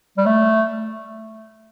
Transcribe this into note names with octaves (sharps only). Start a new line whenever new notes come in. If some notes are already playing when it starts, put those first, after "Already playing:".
G3
A3